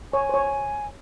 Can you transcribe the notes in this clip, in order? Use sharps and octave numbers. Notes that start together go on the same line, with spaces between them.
C#5 G#5
C5
C#5